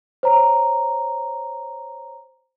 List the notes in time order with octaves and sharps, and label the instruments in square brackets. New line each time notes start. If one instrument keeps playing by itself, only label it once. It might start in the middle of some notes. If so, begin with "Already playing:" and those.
[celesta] C5 C#5 A#5